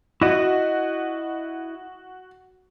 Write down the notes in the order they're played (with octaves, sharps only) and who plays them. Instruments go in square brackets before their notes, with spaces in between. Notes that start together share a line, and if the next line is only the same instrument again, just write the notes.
[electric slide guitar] E4 D#5 [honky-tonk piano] F#4